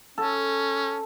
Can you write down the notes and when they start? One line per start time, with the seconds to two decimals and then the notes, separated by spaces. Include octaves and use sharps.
0.18 C#4 A4